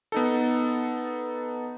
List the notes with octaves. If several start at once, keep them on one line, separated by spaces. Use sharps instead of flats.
B3 D#4 A4